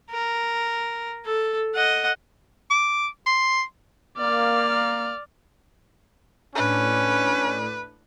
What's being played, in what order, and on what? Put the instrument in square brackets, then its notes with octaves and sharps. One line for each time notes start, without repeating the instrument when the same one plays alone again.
[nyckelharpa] A#4
A4
D#5 F#5
[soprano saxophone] D6
C6
[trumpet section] A#3 [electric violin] D5 F6
[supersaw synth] A2 D4 [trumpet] C#4 [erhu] B4